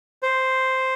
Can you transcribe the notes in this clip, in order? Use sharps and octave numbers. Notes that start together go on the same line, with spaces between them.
C5